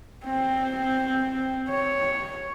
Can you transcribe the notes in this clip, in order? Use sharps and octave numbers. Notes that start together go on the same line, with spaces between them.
C4
C#5